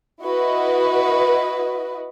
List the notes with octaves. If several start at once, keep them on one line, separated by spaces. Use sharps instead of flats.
E4 F#4 B4 D#5